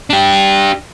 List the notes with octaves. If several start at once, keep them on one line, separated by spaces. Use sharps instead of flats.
D4 G4